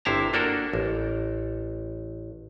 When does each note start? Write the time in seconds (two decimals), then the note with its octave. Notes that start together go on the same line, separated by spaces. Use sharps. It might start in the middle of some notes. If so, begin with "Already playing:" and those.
0.05 G1 C3 E4 C5 A5 A#5
0.33 A#3 D4 F#4 A4 A#4
0.73 A1